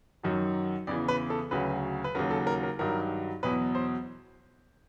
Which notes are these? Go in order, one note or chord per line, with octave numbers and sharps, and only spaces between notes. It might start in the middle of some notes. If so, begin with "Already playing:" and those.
F#2 D#3 F#3
E2 C#3 E3 D5
B4
A4
D2 C#3 F#3 B4
B4
D#2 C#3 F#3 A#4
A4
A#4
A#4
G2 D#3 F#3 A#4
E2 B2 F#3 B4
C5